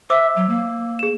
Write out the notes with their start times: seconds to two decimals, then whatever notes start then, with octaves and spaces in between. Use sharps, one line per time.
0.10 C5 E5 D6 E6
0.36 F#3
0.49 A#3
0.99 G#4 E7